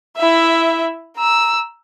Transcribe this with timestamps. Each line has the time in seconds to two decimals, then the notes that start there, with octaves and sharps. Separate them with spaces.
0.17 E4 E5
1.17 A#5 E6